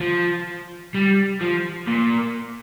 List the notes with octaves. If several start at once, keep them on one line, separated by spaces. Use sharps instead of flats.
F3
G3
F3
A#2